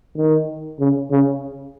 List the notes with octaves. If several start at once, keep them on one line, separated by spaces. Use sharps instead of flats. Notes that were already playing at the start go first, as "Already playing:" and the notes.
D#3
C#3
C#3